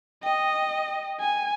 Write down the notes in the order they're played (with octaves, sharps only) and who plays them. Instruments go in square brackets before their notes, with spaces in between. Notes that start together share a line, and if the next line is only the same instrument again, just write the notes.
[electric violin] D#5 [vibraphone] G5
[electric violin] G#5